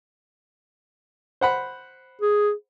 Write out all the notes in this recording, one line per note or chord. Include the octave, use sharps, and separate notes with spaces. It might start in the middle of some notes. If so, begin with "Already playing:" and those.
C5 F#5 B5
G#4